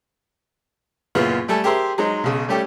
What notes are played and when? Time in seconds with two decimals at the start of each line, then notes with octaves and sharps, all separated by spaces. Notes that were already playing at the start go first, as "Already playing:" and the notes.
1.15 F#2 A#2 C#3 B3 E4 F4
1.48 G3 A3 A4 G#5
1.64 G4 G#4 A#4 C5 E5 C6
1.98 F#3 G#3 D#4 C5
2.24 B1 C#3
2.48 G3 A3 C#4 G4 A4